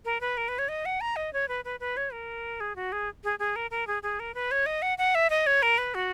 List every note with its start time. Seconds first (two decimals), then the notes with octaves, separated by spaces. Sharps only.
0.05 A#4
0.21 B4
0.37 A#4
0.48 B4
0.59 C#5
0.69 D#5
0.85 F#5
1.01 A#5
1.16 D#5
1.33 C#5
1.48 B4
1.65 B4
1.80 B4
1.97 C#5
2.13 A#4
2.60 G#4
2.76 F#4
2.92 G#4
3.24 G#4
3.39 G#4
3.56 A#4
3.71 A#4
3.87 G#4
4.03 G#4
4.20 A#4
4.34 B4
4.51 C#5
4.66 D#5
4.82 F#5
4.98 F#5
5.15 E5
5.30 D#5
5.47 C#5
5.62 A#4
5.78 B4
5.95 F#4